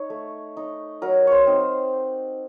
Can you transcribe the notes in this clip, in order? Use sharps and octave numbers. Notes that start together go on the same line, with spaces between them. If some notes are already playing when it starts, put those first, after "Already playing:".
Already playing: D#4 C#5
A3
D#4
F#3 A#4
C5 C#5
C4 D#4